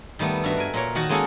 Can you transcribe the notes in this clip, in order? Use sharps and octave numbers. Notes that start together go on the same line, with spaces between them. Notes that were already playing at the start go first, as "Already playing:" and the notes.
D#3 G3 A3 B3
G2 F#4 E5
A#4 G#5
A#2 A#4 C#5
D#3 F#4 F#5 A5
G#3 A#3 C#4 G#4 A4